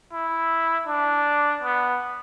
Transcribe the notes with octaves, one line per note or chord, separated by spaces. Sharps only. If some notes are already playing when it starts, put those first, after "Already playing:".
E4
D4
B3